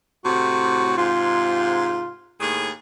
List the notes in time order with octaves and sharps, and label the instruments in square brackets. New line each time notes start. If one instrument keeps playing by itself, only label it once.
[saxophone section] A2 C3 [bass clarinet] F#4
[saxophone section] G#2 C3 [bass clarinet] F4
[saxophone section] D#2 A2 G#4